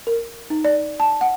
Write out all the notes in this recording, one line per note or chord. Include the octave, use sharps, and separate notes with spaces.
A#4
D#4
D5
A5
F#5